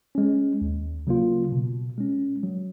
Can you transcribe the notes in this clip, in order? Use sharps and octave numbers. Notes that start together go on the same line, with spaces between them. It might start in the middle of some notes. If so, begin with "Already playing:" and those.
G#3 C#4
D#2
C#3 F#3 A#3 F4
B2
G#3 C#4
F#3